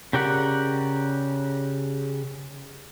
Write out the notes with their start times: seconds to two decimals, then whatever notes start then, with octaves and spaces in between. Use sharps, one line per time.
0.13 C#3 G4 A#4 D5 F#5